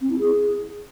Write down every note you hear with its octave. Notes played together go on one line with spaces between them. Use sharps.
C4
E4
G#4